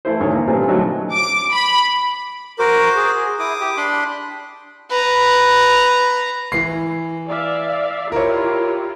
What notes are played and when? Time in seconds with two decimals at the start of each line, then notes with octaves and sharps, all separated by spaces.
0.05 E3 A3 E4 C5
0.20 G#1 E2 D3 A3 C#5 G#5
0.33 A#3
0.48 A#2 E3 G3 A3 C4
0.68 D3 F3 F#3 A3 D#4
1.12 D6
1.52 B5
2.59 F#4 A#4 C5 D6
2.96 G#4
3.39 E4 D6 D#6
3.61 G4
3.77 D4 B5 C6
4.90 B4 A#5
6.52 E3 C7
7.27 D5 E5 F5
8.12 E4 F4 G4 A#4 C#5